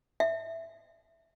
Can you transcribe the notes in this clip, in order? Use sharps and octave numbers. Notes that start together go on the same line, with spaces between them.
E5